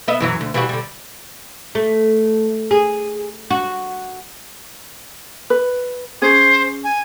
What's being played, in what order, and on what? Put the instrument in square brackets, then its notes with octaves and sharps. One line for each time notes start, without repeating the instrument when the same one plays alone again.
[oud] B3 D#5 E5
F#2 E3 F#3
D2
E3 G3 F#4
D3 G3
A3
G#4
F#4
[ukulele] B4
[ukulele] C#4 G#4 [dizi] C5
[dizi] G#5